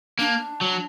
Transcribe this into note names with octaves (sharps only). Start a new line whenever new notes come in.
A#3 D4
F#3